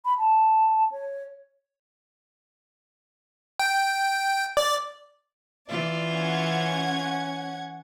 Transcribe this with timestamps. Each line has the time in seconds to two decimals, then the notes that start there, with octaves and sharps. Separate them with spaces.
0.05 B5
0.18 A5
0.92 C#5
3.59 G5
4.57 D5
5.70 E3 F4 D5
6.10 C#4 F#5 G#6